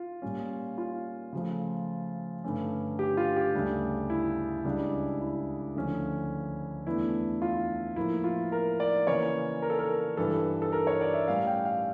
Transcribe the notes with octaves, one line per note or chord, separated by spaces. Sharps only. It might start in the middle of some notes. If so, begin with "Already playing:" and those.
Already playing: F4
A#2 G3 C#4
F4
C#3 F3 A3
G2 D3 A3 C#4
G4
F4
G4
D2 C#3 G3 D4
E4
C#2 C#3 G3 D4
E4
D2 D3 F3 C#4
E2 E3 A3 D4 E4
F4
A2 F3 A#3 E4
F4
A#4
D5
C#3 E3 A#3 C#4 C#5
A#4
A4
A#4
G2 E3 G3 A4
A4
A#4
C#5
D5
E5
A2 G3 C#4 F5
G5
F5